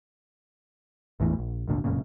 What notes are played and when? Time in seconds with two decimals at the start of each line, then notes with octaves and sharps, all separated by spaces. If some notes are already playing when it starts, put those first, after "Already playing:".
1.20 G#1 E2 A2 E3
1.39 A#1
1.68 G#1 D2 A#2 D3
1.84 F1 F#2 A#2 C#3